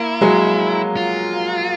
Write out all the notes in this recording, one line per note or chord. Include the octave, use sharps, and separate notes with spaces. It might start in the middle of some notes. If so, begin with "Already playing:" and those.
Already playing: A#3 E4
F#3 G#3
F4